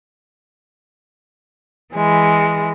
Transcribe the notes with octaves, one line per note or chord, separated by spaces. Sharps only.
E3 G#3